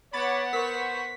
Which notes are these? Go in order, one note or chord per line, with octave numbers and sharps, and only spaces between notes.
B3 C#5 F#5 B5 D6 A6
A#4 C5 C#6 B6